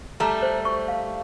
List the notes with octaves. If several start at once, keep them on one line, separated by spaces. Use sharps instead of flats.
G3 A3 A#5
C5
C#6
F5